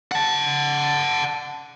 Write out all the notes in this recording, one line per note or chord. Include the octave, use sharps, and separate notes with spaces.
F#5 A5